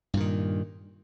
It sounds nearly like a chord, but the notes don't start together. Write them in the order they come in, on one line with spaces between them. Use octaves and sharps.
G2 A#2 D#3